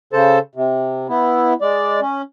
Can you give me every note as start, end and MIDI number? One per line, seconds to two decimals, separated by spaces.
0.13 0.39 49
0.13 0.39 69
0.13 0.39 72
0.13 0.39 81
0.55 1.07 48
1.09 1.53 59
1.09 1.53 64
1.61 2.00 56
1.61 2.00 74
2.01 2.22 61